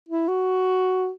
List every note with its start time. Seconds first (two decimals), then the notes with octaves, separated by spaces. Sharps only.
0.09 E4
0.28 F#4